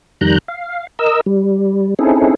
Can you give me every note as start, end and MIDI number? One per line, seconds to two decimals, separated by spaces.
0.21 0.38 41
0.21 0.38 51
0.21 0.38 55
0.21 0.38 82
0.21 0.38 90
0.21 0.38 91
0.48 0.87 77
0.99 1.21 70
0.99 1.21 75
0.99 1.21 88
1.26 1.94 55
1.99 2.35 60
1.99 2.35 61
1.99 2.35 63
1.99 2.35 64
1.99 2.35 68
1.99 2.35 69